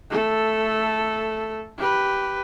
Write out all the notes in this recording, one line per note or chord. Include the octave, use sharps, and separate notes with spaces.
A3 A4
G4 B4